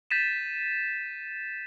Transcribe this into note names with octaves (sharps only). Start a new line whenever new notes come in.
G6 A6 B6 D#7 E7